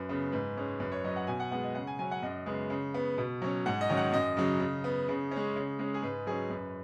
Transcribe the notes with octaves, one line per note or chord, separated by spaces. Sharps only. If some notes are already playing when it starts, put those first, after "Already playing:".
Already playing: F#2 B4
C#3 B3
G#2 B4
G#3 C#4
F#2 B4
C#5
F#3 C#4 D#5
F#5
B2 G#5
F#5
G#3 B3 F#5
D#5
C#3 F#5
G#5
F#3 C#4 G#5
F#5
F#2 D#5
C#3 G#3 B3
C#3
B3
B2
F#3 C#4
G#2 F#5
D#5
D#3 F#3 C#4
F#5
F#2 D#5
C#3 F#3
C#3
B3
C#3
C#4
G#3
C#3
G#3 C#4
G#4
G#2 B4
F#3 C#4 G#4
F#2 B4